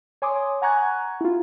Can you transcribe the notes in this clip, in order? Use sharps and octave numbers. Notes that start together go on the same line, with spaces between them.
C#5 G#5 C6 D6 D#6
F#5 G#5 A#5 C#6 F#6 G#6
E4 F4